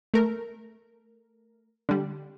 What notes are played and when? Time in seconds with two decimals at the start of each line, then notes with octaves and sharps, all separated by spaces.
0.14 A3 A#4
1.89 D3 G3